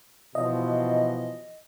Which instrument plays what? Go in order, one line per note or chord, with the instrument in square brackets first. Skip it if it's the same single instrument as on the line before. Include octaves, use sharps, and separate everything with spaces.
[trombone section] B2 E3 F3 [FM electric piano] D#5